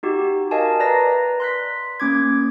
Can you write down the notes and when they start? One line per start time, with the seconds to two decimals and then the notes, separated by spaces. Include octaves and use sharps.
0.03 D#4 F#4 G4
0.51 A#4 D#5 F5 G#5 A5
0.80 B4 D5 A#5 A#6
1.40 C6 F#6 B6
2.00 A#3 C#4 D6 G#6